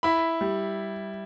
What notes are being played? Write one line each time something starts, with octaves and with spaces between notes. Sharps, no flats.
E4 B5
G3